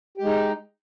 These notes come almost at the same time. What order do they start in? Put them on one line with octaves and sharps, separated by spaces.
G4 G#3 D#4